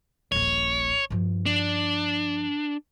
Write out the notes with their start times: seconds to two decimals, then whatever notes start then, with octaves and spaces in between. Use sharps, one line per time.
0.32 D#1 A#1 C#5
1.10 G2 F3
1.46 D4